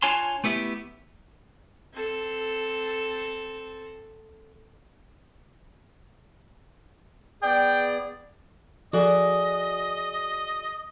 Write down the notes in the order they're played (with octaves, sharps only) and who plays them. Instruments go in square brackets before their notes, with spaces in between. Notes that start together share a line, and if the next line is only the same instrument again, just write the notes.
[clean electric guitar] D4 F4 C#5 G#5 A5 C6
A3 B3 E4 G4 E5
[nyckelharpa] C4 A4
[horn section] B3 G#4 D5 [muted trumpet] G5
[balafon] F3 A4 [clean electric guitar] F#4 G#4 D5 [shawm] D#5